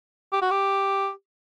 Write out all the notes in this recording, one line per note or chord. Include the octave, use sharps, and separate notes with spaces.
G4
F#4
G4